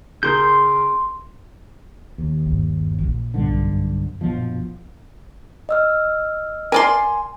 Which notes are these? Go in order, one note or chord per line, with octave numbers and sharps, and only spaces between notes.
C#3 A#4 C6 G6
D#2
G1 G2
A#1 F4
B1 G2 D3
F#2
A#1 B2 F3
D#5 E6 F6
A#4 D5 G#5 C6